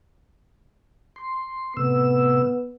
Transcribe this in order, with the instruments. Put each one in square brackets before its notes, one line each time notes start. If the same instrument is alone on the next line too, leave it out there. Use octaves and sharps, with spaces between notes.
[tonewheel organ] C6
[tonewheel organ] A2 C3 E6 [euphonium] B3